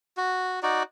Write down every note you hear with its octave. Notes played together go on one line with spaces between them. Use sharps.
F#4
D#4 F#4 D5